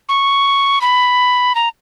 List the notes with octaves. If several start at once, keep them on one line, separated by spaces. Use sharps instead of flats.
C#6
B5
A#5